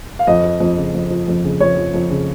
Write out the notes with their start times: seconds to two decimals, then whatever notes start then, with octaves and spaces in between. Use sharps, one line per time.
0.19 F5
0.27 F2 D#5
0.44 F3
0.60 F2
0.77 C#3
0.94 F2
1.10 F3
1.28 F2
1.44 C#3
1.60 F2 C#5
1.77 F3
1.94 F2
2.10 C#3